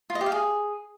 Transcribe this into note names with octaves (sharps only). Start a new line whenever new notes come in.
F4
D#5
G4
F5
G#4